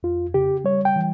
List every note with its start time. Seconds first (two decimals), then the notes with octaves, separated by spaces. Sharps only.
0.03 F2 F4
0.34 C#3 G4
0.64 G3 C#5
0.85 G5
0.96 E3